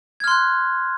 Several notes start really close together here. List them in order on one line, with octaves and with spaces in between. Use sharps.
G#6 F6 C6 F#6